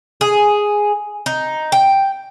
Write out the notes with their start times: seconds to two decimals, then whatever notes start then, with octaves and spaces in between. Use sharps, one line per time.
0.21 G#4
1.26 D#4
1.72 G5